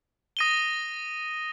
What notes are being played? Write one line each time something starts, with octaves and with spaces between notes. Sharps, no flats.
D#6 A#6 D#7 G7